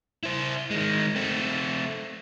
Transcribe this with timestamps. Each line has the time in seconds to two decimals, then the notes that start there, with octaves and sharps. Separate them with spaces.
0.23 E4 C5
0.71 D#3 G#3
1.16 A3 C4